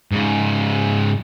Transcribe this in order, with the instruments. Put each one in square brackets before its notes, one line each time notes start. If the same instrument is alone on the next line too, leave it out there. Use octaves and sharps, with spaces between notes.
[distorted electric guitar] G#2 C#3